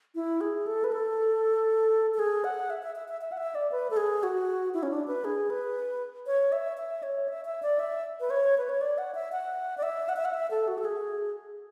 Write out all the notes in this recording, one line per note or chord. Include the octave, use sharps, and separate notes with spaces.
E4
G#4
A4
B4
A4
A4
G#4
F#5
E5
E5
E5
E5
E5
F#5
E5
D5
B4
A4
G#4
F#4
E4
C#4
D4
B4
G#4
B4
C#5
E5
E5
C#5
E5
E5
D5
E5
B4
C#5
B4
C#5
D5
F#5
E5
F#5
D5
E5
F#5
E5
F#5
E5
A4
F#4
A4
G#4